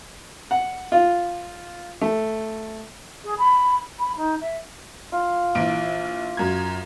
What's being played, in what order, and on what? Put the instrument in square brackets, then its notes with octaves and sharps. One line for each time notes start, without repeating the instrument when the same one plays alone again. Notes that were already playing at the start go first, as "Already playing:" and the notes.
[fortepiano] F#5
F4
A3
[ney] G#4
B5
B5
D#4
E5
[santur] F4
[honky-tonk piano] A#1 E3 D7
F#2 G#6